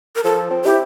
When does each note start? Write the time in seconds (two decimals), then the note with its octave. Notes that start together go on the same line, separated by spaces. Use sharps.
0.16 A#4
0.24 F3 A4
0.51 C4
0.64 E4 G4